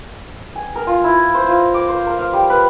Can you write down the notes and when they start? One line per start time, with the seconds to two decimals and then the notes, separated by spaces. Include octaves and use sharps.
0.55 G#5
0.75 A#4
0.87 F4
1.04 E4
1.34 C5
1.48 F4
1.74 D6
1.89 C5
2.07 A#4
2.19 F5
2.33 G3
2.50 B4